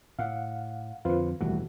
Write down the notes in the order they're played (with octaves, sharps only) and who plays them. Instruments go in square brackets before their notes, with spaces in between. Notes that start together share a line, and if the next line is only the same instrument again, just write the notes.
[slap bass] A2 [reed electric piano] F5 F#5
[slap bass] F2 D3 [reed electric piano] F4 B4 C5
[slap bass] E1 D#2 E3 [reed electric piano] G3 A3 F#4